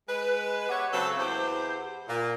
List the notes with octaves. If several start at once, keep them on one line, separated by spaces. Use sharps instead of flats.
G#3 B4
B3 G4 C#5 E5 F#5
C#3 F#3 C4 A4
E2 G4 C5
A#2